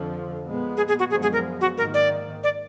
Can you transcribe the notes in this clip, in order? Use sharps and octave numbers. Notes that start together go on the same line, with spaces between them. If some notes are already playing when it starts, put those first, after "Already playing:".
Already playing: F2 D3 F3
A#2 G#3 B3
G#4
G#4
F#4
F#2 D3 F3 G#3 B3 G#4
G#4
A#4
F#4
G#2 D#3 A#3 A#4
D5
D5